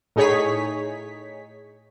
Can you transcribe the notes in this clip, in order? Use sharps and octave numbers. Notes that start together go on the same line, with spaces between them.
A2 D#4 G#4 C#5 B6